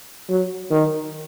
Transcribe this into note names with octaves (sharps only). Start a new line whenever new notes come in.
F#3
D#3